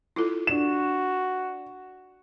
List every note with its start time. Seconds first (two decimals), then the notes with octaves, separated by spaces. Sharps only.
0.16 E4 F4 A4
0.47 D4 F#4 E7